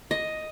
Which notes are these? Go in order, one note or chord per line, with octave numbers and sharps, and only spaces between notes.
D#5